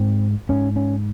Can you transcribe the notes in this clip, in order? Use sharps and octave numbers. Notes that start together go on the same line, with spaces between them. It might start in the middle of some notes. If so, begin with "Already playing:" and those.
Already playing: G#2 C4
G#2 C#4
C#4